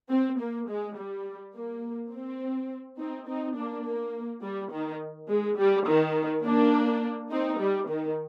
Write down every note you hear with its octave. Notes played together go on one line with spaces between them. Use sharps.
C4
A#3
G#3
G3
A#3
C4
C4 D#4
C4 D#4
A#3 D4
A#3
G3
D#3
G#3
G3
D#3
A#3 D4
C4 D#4
G3
D#3